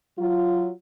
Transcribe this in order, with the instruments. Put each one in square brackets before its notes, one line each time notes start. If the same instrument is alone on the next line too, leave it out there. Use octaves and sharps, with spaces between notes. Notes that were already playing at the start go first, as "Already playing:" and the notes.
[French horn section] F#3 F4